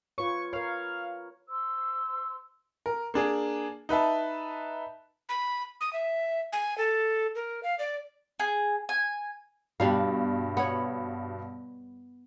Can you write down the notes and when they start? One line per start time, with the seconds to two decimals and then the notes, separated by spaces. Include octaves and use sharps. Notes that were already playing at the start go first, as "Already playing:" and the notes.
0.18 F4 B4 C#5 C#6
0.53 A#4 C#5 F5
1.49 C5 C6 E6
2.86 A#4
3.14 A#3 D4 G#4
3.89 D#4 B4 E5 A5
5.29 B5
5.81 D#6
5.93 E5
6.53 G#5
6.78 A4
7.35 A#4
7.63 F5
7.79 D5
8.40 G#4
8.89 G#5
9.80 G2 B2 G3 D4 F5
10.57 B3 C#5